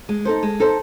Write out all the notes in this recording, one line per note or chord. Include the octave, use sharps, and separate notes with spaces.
G#3
D#4 A4 C5
G#3
D#4 A4 C5